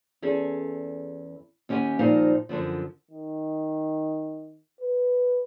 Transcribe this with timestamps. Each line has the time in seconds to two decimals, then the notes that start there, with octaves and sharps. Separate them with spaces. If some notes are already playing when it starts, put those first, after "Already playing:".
0.22 E2 C#4 G#4 A4
1.69 D#2 C#4 G4 F#5 G#5
1.99 A#2 F3 G3 D#4 C5 F5
2.49 F#2 A2 D3 F3
3.11 D#3
4.81 B4